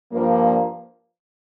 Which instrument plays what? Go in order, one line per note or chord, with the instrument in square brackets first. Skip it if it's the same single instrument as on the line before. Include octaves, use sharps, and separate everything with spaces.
[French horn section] G2 F3 A#3